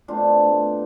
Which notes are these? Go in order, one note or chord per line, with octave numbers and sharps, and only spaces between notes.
B2 A3 C4 D4 F4
B2 A3 C4